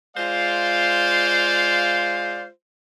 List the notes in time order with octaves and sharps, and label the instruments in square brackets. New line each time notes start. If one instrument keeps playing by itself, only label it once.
[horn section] G#3 F4 C5 D5 F5